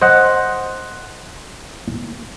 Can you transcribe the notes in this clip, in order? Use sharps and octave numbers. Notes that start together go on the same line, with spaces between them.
C5 D#5 F#5